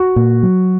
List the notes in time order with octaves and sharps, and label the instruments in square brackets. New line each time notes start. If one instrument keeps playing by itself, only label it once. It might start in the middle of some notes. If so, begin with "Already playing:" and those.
Already playing: [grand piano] F#4
[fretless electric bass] A#2
F#3